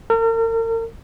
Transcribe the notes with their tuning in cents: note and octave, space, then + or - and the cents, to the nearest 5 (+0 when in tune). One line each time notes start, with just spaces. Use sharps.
A#4 -40